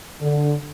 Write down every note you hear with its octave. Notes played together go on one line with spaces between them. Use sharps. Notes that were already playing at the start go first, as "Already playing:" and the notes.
D3